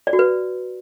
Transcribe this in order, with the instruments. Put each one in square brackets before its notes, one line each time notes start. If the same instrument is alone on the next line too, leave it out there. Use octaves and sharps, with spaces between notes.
[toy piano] D5
F#4
B4